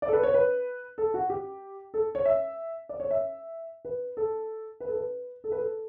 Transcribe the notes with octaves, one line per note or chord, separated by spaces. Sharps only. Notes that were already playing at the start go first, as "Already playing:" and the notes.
D5
A4
B4
C#5
B4
A4
F#4
G4
A4
C#5
E5
D5
C#5
E5
B4
A4
B4
A4
B4
A4
B4
A4